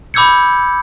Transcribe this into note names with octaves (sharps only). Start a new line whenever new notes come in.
B5 D6 E6 G6 G#6 C#7